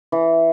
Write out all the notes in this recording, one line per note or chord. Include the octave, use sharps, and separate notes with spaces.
E3